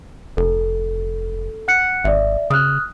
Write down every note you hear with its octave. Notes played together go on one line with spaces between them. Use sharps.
F1 A4
F#5 F#6 C#7
G#1 D5 E5
C#3 D#6 F6 F#6